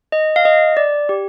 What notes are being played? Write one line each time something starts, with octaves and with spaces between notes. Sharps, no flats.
D#5
F5
D#5
D5
G4